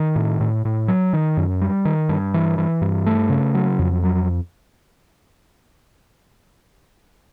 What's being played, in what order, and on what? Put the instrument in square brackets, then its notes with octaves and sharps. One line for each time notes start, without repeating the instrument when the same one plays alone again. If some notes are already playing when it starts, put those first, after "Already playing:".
Already playing: [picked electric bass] D#3
A2
A2
A2
F#3
D#3
F#2
G3
D#3
G2
E3
E3
G2
A3
C#3
F#3
F2
F#3